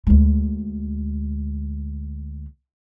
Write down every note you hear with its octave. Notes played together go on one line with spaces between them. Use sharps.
D2 G#3